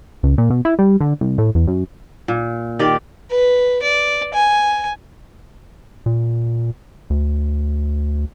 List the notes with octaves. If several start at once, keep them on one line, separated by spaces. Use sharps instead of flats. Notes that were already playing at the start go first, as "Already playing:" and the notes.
C#2
A#2
B2
E4
G3
D3
C2
A2
E2
F#2
A#2
D#3 G4 D5
B4
D5
G#5
A#2
D2